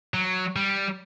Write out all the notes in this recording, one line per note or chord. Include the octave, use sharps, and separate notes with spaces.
F#3
G3